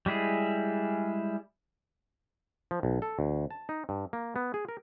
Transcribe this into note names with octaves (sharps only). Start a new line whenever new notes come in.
G3 G#3 E4 G#4
F3
B1
A4
D2
A5
D#4
G2
A#3
B3
G#4
A#4